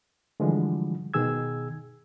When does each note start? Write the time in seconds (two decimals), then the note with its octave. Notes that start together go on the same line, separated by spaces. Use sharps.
0.40 D3 E3 F3 G3 G#3
1.14 B2 D#3 G#4 E6 G#6